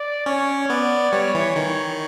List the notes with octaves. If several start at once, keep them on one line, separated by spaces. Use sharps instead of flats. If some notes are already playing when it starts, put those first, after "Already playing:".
Already playing: D5
C#4 C#5
B3 D5
G3 C#5
E3
D#3